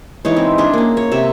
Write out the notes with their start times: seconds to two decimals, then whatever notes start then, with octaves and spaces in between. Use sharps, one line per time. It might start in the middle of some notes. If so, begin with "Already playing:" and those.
0.25 E3 G#3 D#4 C#5
0.37 C4
0.58 D4 G#4
0.73 A#3 C#4
0.97 C#5
1.12 C3 E5